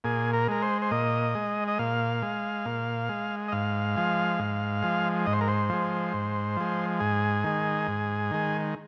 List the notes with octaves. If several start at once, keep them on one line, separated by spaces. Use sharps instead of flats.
A#2 G#4
A#4
G#3 A#4
C5
C5
A#2 D#5
G#3
D#5
A#2 F5
G#3
A#2
G#3
D#5
G#2 F5
F3 G#3
G#2
F3 G#3
G#2 D#5
C5
A#4
C5
F3 G#3
G#2
F3 G#3
G#2 G#4
D#3 G#3
G#2
D#3 G#3